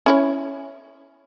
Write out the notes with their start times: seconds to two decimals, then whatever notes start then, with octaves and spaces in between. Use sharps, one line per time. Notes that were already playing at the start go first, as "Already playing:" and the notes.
0.06 C#4 E4 C#5